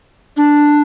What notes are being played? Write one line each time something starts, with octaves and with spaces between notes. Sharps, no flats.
D4